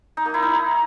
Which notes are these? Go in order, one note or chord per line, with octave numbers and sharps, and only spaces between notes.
D#4
A#3
E4
D#4